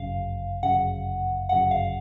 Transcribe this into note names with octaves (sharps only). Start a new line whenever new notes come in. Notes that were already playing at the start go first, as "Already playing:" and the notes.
Already playing: G1 F#2 C#3 F5
G1 F#2 C#3 F#5
G1 F#2 C#3 F#5
F5